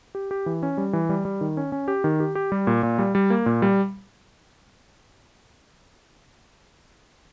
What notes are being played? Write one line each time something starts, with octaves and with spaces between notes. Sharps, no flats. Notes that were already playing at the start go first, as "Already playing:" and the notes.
G4
G4
E3
C#4
G3
E3
G3
G3
D#3
C#4
C#4
G4
D#3
G4
G4
G3
A#2
A#2
G3
G3
A#3
A#2
G3